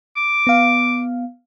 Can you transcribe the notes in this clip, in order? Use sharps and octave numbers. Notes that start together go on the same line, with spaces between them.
D6
B3 F5